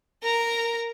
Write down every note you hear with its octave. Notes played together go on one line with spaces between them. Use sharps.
A#4 A#5